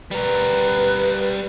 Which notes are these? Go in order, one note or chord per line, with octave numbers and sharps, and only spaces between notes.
G3 A#4 B4